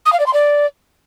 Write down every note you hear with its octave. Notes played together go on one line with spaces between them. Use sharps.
D#6
F5
D5
C6
D5